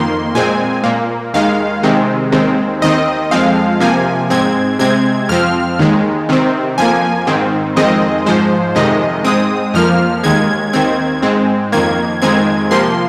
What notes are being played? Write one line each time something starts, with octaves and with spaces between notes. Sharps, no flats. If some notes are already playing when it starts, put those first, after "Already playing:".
Already playing: F2 D#3 A#3 C6
A#2 G#3 C4 G#5
A#2 A#3
D#2 D#3 G#3 F5
C3 D#3 G#3 C4
D#2 D#3 G#3 C4
D#2 D#3 C4 D#5
F2 F3 G#3 C4 F5
C3 F3 A#3 G#5
G#2 G#3 C4 G#6
C3 G#3 C4 G#6
F2 F3 C4 F6
D#2 D#3 G#3
C3 D#3 C4
F2 F3 A#3 G#5
G#2 D#3 C4
F2 D#3 G#3 C4 D#5
G#2 F3 G#3 C5
F2 C3 D#3 G#3 D#5
G#2 G#3 C4 D#6
F2 F3 A#3 F6
D#2 D#3 G#3 G#6
D#2 D#3 C4 G#6
G#2 G#3 C4
F2 D#3 A#3 G#6
F2 D#3 G#3 C4 G#6
C3 F3 A#3 C6